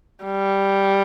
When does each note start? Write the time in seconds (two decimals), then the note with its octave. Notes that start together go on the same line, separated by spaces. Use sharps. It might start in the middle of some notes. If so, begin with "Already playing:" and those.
0.24 G3